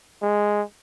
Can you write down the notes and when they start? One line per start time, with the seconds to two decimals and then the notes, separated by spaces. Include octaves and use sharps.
0.22 G#3